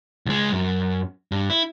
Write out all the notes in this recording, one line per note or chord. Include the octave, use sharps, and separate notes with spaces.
C#2 G#3
F#2
G2
E4